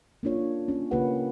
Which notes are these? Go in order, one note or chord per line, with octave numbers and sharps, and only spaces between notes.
A#3 C#4 D4 F4 C#5
C#4
C#3 A#3 F4 G4 B4 F#5